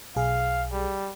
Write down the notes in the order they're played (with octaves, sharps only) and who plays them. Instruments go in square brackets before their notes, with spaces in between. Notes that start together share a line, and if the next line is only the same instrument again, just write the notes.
[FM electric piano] B1 G#4 [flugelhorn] F5
[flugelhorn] G3